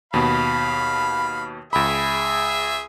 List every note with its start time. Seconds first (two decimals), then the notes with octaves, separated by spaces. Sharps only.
0.14 D#2 B2 F5 B5
1.73 C#2 G#4 E5 B5